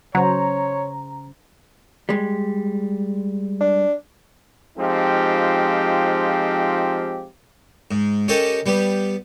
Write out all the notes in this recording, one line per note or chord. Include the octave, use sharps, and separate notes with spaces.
C#3 F#3 C5 C#5 A#5
G3 G#3
D4
F3 G#3 C4 D#4 F4 G4
G#2
C#4 G4 A4 A#4 D#5
G3 B3 G4